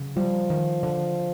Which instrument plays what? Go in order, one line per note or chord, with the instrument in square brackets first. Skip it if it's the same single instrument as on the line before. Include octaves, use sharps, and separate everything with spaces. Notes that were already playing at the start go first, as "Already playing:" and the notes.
Already playing: [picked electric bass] C#3 F#3
[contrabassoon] F3 [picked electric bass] G3
[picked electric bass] D#3
D3